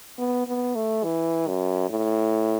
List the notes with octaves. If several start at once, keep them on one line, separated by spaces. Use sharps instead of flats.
B3
B3
A3
E3
F#2
A2